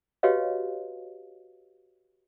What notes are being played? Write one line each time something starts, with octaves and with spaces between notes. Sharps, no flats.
F#4 G4 B4 C#5 D#5 F5